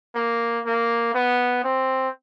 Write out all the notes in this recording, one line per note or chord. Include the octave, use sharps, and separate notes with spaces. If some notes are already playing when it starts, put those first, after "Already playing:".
A#3
A#3
B3
C4